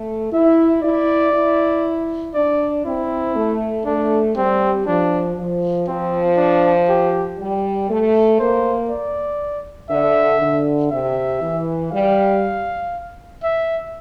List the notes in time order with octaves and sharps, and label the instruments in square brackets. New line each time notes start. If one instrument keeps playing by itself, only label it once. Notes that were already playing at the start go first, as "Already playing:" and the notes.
Already playing: [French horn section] A3
[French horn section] E4 [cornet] E5
[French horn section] E4 [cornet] D5
[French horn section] E4
[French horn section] D4 [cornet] D5
[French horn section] C4 [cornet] E4
[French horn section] A3
[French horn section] A3 [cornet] D4
[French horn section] G3 [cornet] C4
[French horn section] F3 [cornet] D4
[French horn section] F3
[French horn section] F3 [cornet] C4
[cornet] D4
G4
[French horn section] G3
A3
[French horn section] A#3 [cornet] C5
[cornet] D5
[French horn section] D3 [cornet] E5
[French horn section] D3
[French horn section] C3 [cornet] E5
[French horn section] E3
[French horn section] G3 [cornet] F5
[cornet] E5